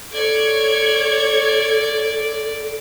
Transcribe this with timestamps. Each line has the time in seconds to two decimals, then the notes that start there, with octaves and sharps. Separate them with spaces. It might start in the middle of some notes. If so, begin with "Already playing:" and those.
0.12 A4 C#5 D5 G#6